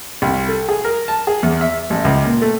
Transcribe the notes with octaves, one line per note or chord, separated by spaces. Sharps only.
C2
A4
G#4
A#4
A5
G#4
E2
E5
A1
C#2
A#2
A3